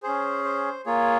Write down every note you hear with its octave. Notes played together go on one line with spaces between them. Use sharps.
C#4 G#4 C5
C5
A#3 F4 G#4 C#5